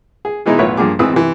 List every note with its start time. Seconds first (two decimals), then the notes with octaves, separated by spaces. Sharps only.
0.25 G#4
0.46 B2 E3 G#3 D#4 E4
0.59 B1 A2 F4 B4 C#5 E5
0.77 G2 F3 A#3 G#4 D6
0.99 G#1 E3 C4 B4 D#6 E6
1.13 C3 E3